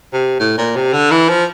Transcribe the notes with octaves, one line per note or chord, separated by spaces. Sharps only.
C3
A2
A#2
C3
D3
E3
F3